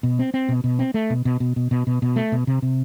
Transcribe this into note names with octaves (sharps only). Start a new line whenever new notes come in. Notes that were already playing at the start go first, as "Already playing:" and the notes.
B2
C4
C4
B2
B2
C4
A3
B2
B2
B2
B2
B2
B2
B2
A3
B2
C3
C3